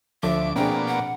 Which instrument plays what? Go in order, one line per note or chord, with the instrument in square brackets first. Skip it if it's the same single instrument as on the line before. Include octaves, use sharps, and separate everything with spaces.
[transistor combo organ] D2 D6 [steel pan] F3 A4 [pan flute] E5
[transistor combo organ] B2 A#3 D5 [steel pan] C4 D4 G#4 [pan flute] G5
[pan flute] F#5